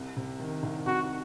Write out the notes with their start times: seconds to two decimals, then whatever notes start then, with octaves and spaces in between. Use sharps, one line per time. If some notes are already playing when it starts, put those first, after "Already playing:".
Already playing: C2
0.16 C3
0.39 D#3
0.63 C2
0.86 C2 F#4